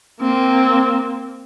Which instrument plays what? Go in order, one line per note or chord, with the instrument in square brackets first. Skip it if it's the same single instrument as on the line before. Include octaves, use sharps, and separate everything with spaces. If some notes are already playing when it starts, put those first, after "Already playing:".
[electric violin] A#3 C4